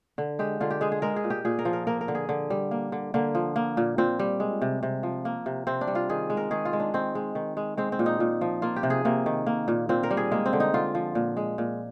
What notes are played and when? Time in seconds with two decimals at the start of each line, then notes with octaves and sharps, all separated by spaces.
0.18 D3
0.39 G#3 G4
0.60 D3 F4
0.71 G4
0.81 G#3 G#4
0.92 G#4
1.02 G#3 A#4
1.16 G#4
1.24 A#2
1.30 G4
1.45 A#2 G#4
1.59 A#4
1.65 F3
1.73 A#4
1.87 A#3 A#4
2.01 A#4
2.08 D3
2.15 G#4
2.29 D3
2.50 G3
2.71 A#3
2.92 D3
3.14 D3 A#3
3.35 F3
3.56 A#3
3.77 A#2
3.98 A#2 C4
4.19 G3
4.40 G#3
4.62 C3
4.83 C3
5.03 F3
5.25 A#3
5.46 C3
5.67 C3 C4
5.81 D4
5.87 G3
5.95 F4
6.10 D#3 G#4
6.30 G#3
6.37 A#4
6.51 D#3 G#4
6.65 F4
6.73 G#3
6.80 D4
6.94 D#3 C4
7.15 G#3
7.35 D#3
7.57 G#3
7.77 G#3 C4
7.92 C4
7.99 A#2
8.06 D#4
8.20 A#2
8.41 F3
8.62 A#3 F4
8.76 G4
8.83 C3
8.90 G#4
9.05 C3 A#3
9.26 D#3
9.47 A#3
9.68 A#2
9.89 A#2 C4
10.03 A#4
10.11 G3
10.17 G#4
10.31 G#3 A#3
10.46 C4
10.53 D3
10.60 D#4
10.74 D3 F4
10.95 F3
11.15 A#2
11.37 G#3
11.58 A#2